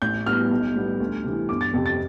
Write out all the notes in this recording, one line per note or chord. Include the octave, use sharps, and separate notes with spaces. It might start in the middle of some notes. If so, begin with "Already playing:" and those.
A1 G6
A2 G3 B3 F6
B1
A2 G3 B3
D2
C3 E3
G1 D6
A6
F2 C3
A6